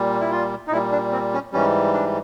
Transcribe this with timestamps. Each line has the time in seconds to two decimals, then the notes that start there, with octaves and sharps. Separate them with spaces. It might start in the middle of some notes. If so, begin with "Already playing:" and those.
Already playing: A#2 G3
0.21 E4
0.31 F4
0.67 D#4
0.72 A#2 E4
0.75 G3
0.92 D4
1.12 C4
1.33 C#4
1.53 G#2 E3 G3 C#4
1.93 D4